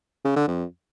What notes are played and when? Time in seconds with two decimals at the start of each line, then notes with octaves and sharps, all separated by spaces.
0.25 C#3
0.36 D3
0.48 F2